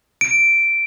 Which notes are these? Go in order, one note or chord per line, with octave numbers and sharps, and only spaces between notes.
D7